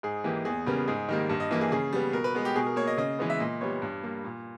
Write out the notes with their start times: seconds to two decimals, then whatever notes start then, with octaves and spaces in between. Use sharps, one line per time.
0.03 G#2 G#4
0.24 E3 A#3 G4
0.45 E2 G#4
0.66 C#3 G3 B3 A#4
0.88 G#2 G#4
1.09 D#3 G3 A#3
1.29 G2
1.40 D#5
1.51 E3 A#3
1.61 G#4
1.72 C#3 G#4
1.93 G3 B3
2.13 B2 A#4
2.24 B4
2.35 G#3 B3
2.45 G4
2.55 B2 G#4
2.66 A#4
2.76 A#3 C#5
2.87 D#5
2.98 C#3 D#5
3.19 E3 G#3 B3
3.30 E5
3.40 A#2 D#5
3.61 G3 B3 C#5
3.82 G2
4.03 G3 A#3
4.24 A#2